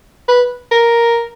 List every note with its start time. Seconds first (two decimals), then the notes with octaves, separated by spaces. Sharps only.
0.28 B4
0.72 A#4